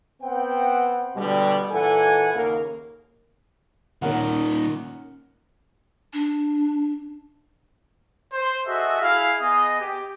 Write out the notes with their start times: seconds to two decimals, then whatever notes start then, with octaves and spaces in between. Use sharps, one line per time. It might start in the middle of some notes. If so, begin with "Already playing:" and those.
0.22 B3 C4 F#5 G5
1.16 B2 D3 G3
1.71 A#2 E3 A4 F#5 G#5
2.33 D#2 C#3 A#3 A#4
4.02 A#2 D#3 C#4 A#4 F#5
6.13 D4
8.33 C5
8.66 F#4 G#4 A4 D#5 E5
9.01 E4 G#4 F5
9.39 B3 G#4 D#5
9.81 G4